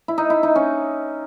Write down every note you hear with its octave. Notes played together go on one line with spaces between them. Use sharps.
E4
D#4
E4
D#4
C#4